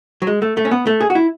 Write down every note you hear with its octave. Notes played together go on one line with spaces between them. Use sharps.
F#3
G#3
A3
A3
C#4
B3
A3
G#4
F#4
E4